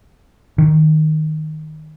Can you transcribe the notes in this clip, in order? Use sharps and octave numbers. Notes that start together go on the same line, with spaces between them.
D#3